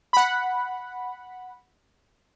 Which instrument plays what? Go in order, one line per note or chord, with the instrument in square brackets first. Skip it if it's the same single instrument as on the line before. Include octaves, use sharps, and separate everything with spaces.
[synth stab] F#5 B5